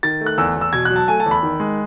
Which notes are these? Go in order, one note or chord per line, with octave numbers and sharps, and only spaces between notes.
D#3 A6
A3
F#6
E2 E6
E2
E6
B2 G#6
F#3 F#6
A5
A3 G#5
A5
E2
B5
D#3
G#3